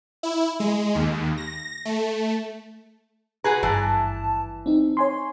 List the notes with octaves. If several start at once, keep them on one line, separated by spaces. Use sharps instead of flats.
E4
G#3
D#2
A#6
A3
F#4 G#4 B4 A#5 G#6
G#1 G2 E3 A5
C4 D#4
C#5 G#5 C6